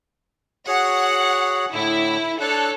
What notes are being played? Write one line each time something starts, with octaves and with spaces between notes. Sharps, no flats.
F#4 G#4 C#5 F#5
A2 D3 E4
D4 A4 C#5 F#6